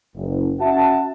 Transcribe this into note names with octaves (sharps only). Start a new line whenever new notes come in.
F#1
C#4 F#4 E5 F#5 A5